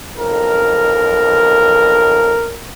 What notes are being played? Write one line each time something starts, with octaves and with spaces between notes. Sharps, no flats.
B1 F2 A#4